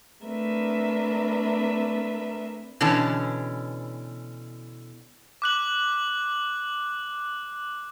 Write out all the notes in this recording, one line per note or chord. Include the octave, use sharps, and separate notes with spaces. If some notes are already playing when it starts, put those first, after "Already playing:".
A3 C4 D4 A#4 B4 E5
B2 D3 E3 C#4 A5
D6 F#6 F#7